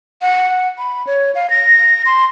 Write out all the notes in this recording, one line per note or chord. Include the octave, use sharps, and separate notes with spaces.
F#5
B5
C#5
F5
A#6
C6